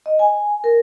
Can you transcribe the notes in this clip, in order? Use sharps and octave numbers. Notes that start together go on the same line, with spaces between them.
D#5
G#5
A#4